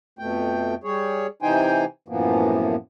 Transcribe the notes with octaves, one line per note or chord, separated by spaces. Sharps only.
F2 B2 A3 G5
G3 G#4 C#5
C3 E3 D#4 C5 G5 G#5
F#2 A2 E3 F3 A#3 B3